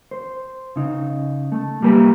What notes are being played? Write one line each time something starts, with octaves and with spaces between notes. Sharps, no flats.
C5
C#3 D#4
A3
G3 A#3 G4 B4